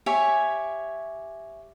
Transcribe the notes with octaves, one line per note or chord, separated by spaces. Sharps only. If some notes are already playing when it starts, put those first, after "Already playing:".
G4 C#5 E5 G#5